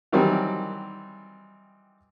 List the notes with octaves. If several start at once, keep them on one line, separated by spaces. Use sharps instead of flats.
D#3 E3 F#3 G3 C4